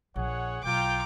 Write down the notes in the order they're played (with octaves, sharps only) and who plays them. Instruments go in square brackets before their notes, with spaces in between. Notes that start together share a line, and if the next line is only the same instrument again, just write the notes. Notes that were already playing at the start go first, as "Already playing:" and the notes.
[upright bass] A#1 [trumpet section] G#4 C#5 F#5
[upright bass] B1 [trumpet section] F4 G5 [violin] A#5 D6